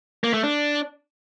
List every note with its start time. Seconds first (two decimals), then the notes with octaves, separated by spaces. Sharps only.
0.24 A#3
0.34 A3
0.44 D4